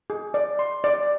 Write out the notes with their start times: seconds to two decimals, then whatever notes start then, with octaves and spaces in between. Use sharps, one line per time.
0.10 G#4
0.34 D5
0.59 C6
0.84 D5